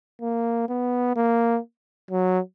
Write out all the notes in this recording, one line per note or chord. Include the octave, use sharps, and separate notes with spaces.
A#3
B3
A#3
F#3